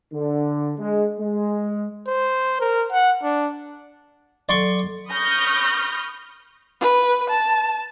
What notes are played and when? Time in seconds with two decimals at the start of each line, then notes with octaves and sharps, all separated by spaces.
0.12 D3
0.79 G#3
1.20 G#3
2.07 C5
2.60 A#4
2.92 F#5
3.23 D4
4.49 F#3 A4 D5 C6 C#6
5.10 B5 C#6 D#6 F6 G6 A#6
6.81 B4
7.30 A5